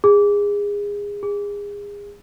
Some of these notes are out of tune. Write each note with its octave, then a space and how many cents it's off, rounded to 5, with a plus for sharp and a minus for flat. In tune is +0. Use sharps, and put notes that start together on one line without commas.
G#4 -25
G#4 -30